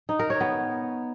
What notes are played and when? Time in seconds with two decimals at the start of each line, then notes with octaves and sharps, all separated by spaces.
0.09 D#4
0.19 A#4
0.30 C#5
0.41 B3